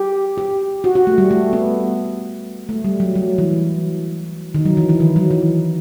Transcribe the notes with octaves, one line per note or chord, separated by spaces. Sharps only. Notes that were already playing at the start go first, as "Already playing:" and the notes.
Already playing: G4
G4
F#4
F#4
A3
G3
A3
B3
A3
G3
F#3
F#3
E3
D#3
F#3
E3
E3
D#3
F#3
E3